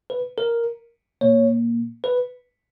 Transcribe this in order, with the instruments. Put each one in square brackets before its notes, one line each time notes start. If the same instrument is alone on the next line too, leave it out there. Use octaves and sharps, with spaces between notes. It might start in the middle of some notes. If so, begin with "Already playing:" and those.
[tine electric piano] B4
A#4
A#2 A#3 C#5
B4